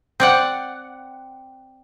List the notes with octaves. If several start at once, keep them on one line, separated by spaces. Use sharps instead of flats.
C4 D5 F#5